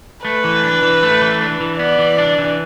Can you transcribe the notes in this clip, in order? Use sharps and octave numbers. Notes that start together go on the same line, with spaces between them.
A3 B4
E3
D4
E3
A3
E3
D4
E3
B3 D5
E3
D4
E3